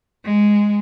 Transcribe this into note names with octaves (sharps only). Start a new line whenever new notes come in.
G#3